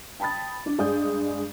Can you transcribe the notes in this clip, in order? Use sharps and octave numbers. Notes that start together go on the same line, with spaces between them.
G5 A5 B5 D#6 A6
D4
G2 G#3 G#4 D5 D#6 G6